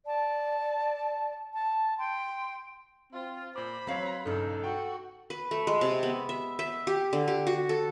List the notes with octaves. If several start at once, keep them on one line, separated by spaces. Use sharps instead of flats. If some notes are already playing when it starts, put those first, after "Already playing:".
D5 A5
A5
G5 C6
C4 F4
A#2 C5 B5 D6
F#3 C4 B4 C#5 F5
B1 G2 C#3 D#4 A4
F#4 G5
B4
A3
G#3
C3
B3
E5
E5
G4
D3
G4
F#4
A4